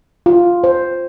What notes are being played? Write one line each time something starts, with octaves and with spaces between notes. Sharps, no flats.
F4
C5